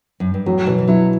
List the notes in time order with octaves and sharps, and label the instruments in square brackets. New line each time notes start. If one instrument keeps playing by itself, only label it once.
[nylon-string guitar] F#2
G2
[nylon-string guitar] A2 [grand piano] F#3
[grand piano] B2 [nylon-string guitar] E3
[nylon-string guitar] E3
[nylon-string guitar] F#3 [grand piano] E4